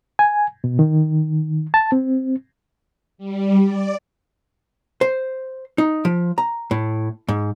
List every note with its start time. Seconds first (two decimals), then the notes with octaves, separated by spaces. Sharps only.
0.19 G#5
0.64 B2
0.79 D#3
1.74 A5
1.92 C4
3.18 G3
3.64 D5
5.01 C5
5.78 D#4
6.05 F3
6.38 A#5
6.71 A2
7.28 G#2